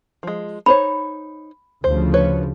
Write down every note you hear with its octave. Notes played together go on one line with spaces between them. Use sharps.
F3 G#3
D#4 C5 C#5 B5
D2 C#3 F3 C5
A4 B4 C#5